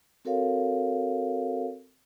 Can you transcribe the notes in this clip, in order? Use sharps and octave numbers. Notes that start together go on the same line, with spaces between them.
C4 F#4 A4 A#4 C#5 F5